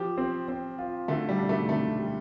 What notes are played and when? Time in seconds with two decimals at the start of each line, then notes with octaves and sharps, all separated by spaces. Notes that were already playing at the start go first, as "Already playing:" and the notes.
Already playing: F3 G4
0.18 C4
0.48 C4
0.78 F4
1.08 D3 A3
1.29 G3
1.38 D4
1.49 A3
1.69 D3 A3
1.99 G3